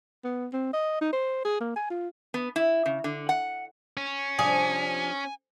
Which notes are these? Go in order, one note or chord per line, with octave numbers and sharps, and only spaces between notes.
B3
C4
D#5
D#4
C5
G#4
A#3
G#5
F4
B3
E4
C#3
D3
F#5
C#4
C3 F3 D4 G#4 G#5